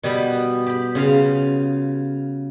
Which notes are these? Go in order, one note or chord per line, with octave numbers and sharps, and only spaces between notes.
B2 G3 B3 G4 B5
G4 B5
C#3 F4 F5